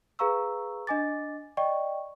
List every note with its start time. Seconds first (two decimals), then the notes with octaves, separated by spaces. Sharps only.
0.19 G#4 B4 F5 A#5 C#6 E6
0.87 D4 D#5 G#5 D6 A6
1.57 D5 D#5 G5 C#6